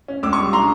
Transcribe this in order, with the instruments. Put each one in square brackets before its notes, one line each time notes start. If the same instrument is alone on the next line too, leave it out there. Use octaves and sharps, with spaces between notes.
[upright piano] C#4
C#2 D6 E6
C#6 D#6
G3
A#5 C6